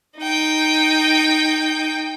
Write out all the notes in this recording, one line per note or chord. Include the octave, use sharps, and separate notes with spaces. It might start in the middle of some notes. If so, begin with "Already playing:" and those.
D#4 G5